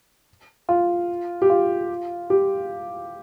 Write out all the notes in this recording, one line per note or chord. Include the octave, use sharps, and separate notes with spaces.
F4
G4
F4
G4